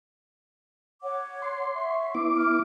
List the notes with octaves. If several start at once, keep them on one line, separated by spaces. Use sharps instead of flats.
C#5 F#5 D6
C6
E5 C#6
B3 E4 D6
F6